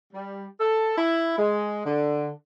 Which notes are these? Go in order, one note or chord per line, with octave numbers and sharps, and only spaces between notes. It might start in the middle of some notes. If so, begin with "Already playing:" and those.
G3
A4
E4
G#3
D3